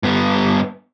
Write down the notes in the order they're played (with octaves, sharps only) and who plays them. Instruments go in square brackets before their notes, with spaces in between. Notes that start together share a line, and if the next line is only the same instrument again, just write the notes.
[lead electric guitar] G2 B3